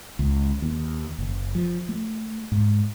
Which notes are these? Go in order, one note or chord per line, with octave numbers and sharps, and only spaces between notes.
C#2
D#2
F#1
F3
A3
G#2